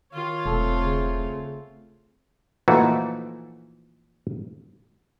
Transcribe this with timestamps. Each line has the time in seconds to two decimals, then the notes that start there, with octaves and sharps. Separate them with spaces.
0.13 D#3 F4 C#5
0.46 E1 A3 C4 A4
0.80 C#3
2.68 A#2 E3 F3 A3 D#4 F#4